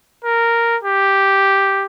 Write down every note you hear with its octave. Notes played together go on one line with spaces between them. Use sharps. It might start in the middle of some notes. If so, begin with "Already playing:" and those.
A#4
G4